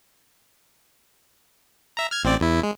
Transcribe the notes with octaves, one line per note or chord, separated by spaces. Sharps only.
E5 A#5
F6 G#6
A1 C4 D5
E2 E4
G#3